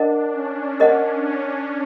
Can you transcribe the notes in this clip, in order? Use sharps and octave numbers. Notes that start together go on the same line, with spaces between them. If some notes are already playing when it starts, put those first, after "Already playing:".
Already playing: D4 A#4 D#5 F#5
C#4
D4 A#4 D#5 F#5
C#4